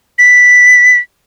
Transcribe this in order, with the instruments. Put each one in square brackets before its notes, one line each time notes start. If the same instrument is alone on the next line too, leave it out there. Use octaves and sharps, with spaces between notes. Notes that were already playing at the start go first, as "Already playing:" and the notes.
[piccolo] B6